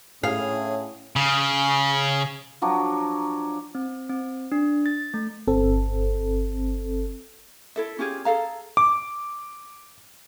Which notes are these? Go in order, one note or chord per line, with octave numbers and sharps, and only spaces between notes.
A2 C#4 G#4 F5
C#3
F3 F#3 D4
C4
C4
D4
A6
A3
G1 C4 A4
E4 A4 E5
C#4 F4 G4 G#4
G#4 A4 F5 A#5
D6